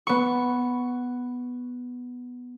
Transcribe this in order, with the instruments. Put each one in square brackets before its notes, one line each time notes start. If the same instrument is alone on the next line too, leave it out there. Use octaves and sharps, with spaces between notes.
[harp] B3 C#6